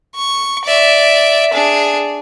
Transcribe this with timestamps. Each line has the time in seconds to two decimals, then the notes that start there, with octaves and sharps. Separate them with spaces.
0.15 C#6
0.65 D5 E5
1.53 D4 G#4